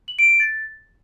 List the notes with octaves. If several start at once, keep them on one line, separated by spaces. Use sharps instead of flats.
F#7
D7
D7
A6